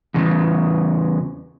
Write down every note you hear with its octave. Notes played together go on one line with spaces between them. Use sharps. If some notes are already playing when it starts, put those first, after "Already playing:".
E2 C#3